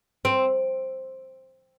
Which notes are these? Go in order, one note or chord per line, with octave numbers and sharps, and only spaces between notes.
C4